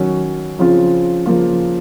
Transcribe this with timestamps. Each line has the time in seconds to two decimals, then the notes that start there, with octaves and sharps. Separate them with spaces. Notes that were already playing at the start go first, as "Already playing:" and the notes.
Already playing: D#3 F#3 C#4
0.59 C#3 F3 C4 F4
1.26 C#3 F3 A#3 F4